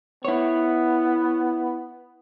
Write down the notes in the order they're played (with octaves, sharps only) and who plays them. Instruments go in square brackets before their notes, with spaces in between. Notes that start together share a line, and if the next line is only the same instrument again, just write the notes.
[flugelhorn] B3 [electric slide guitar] E4 C#5